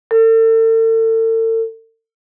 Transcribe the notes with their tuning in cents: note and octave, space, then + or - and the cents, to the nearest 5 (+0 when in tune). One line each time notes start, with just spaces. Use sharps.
A4 +40